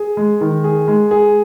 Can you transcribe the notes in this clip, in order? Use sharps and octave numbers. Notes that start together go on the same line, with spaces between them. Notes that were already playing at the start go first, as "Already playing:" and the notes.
Already playing: G#4
G#3
D#3
G#4
G#3
G#4